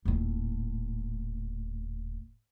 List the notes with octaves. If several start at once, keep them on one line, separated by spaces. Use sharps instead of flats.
D#1 A2